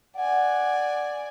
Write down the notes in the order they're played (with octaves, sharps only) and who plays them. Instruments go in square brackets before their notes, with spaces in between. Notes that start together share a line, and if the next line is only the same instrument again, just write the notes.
[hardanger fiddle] D5 G#5 [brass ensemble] F#5